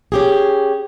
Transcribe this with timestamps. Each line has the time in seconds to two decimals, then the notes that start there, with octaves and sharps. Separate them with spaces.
0.12 C#4 G4 G#4